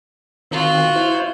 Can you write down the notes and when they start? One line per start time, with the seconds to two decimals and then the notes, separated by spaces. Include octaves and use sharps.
0.51 D#3 C4 F4 F#4
0.96 E4 C5